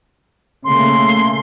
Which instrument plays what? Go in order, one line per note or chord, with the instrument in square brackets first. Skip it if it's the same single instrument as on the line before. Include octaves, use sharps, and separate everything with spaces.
[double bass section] C#3 A3 A#3 [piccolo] C6